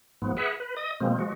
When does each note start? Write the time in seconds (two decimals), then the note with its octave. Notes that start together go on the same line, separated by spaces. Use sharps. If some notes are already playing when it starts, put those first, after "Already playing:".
0.22 G#2 F3 B3
0.37 G#4 B4 E5 F#5
0.60 B4
0.77 D#5 D#6
1.00 B2 F3 G#3 A#3 C4
1.19 F3 G#3 F#4